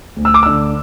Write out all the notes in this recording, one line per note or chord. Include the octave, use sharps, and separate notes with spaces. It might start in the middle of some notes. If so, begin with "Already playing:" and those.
D2
E6
D6
D3 E6